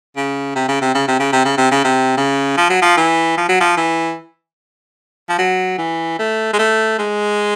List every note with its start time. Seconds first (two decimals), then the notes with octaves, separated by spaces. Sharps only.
0.16 C#3
0.55 C3
0.68 C#3
0.81 C3
0.94 C#3
1.08 C3
1.20 C#3
1.33 C3
1.45 C#3
1.58 C3
1.71 C#3
1.84 C3
2.17 C#3
2.57 F3
2.70 F#3
2.82 F3
2.97 E3
3.37 F3
3.49 F#3
3.60 F3
3.77 E3
5.29 F3
5.38 F#3
5.78 E3
6.19 A3
6.53 G#3
6.59 A3
6.99 G#3